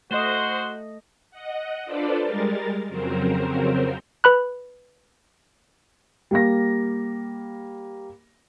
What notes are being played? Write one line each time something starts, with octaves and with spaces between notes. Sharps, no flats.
A3 F#4 C5 D#5
D#5 F#5
D4 F4 A4 B4 C5 D5
G3 G#3 A#4 A6
F2 C#3 F#3 C4 A#4 C5
B4 B5 F#6
G3 A#3 A#6